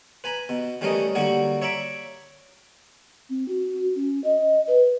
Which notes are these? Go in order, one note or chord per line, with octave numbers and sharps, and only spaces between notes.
B4 G#5 A#5 B5
B2
E3 G3 A3 C#4 A#4 D#5
D3 F#3 G3 A#3 F#4 F#5
C#5 E5 A#5 B5 D6
C4
F#4
C#4
D#5
B4